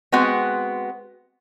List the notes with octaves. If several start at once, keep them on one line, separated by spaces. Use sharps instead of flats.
G#3 B3 C4 F#4